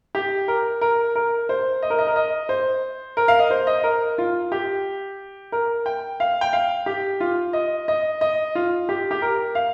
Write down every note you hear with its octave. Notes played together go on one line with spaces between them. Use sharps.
G4
A#4
A#4
A#4
C5
D#5
A#4
D#5
A#4
D#5
C5
A#4
F5
D#5
C5
D#5
A#4
F4
G4
A#4
G5
F5
G5
F5
G4
F4
D#5
D#5
D#5
F4
G4
G4
A#4
F5